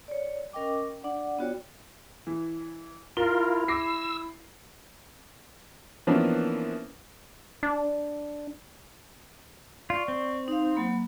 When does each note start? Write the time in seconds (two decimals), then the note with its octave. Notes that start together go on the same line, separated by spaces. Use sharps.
0.08 C#5 D5
0.53 C#4 A#4 D#5 G5 D6
1.03 D4 D5 F#5
1.38 B3 F4 F#4 C#5 D5 G5
2.27 E3
3.17 E4 F4 A#4 G7
3.68 D6 E6 A#6 C7
6.07 E3 F3 A#3 B3 C#4 D4
7.63 D4
9.90 F4 D5 C#6
10.08 C4
10.48 D#4 F5
10.75 F#3 A#3 B5